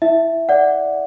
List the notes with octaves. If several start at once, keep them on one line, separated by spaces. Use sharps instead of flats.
E4 E5
D5 F#5